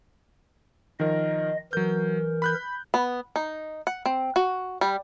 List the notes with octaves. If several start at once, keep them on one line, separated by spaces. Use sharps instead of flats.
D#3 F3 A#4 D#5
E3 F#3 A#4 G6
B5 F#6 G6
B3
D#4
F#5
C4
F#4
G3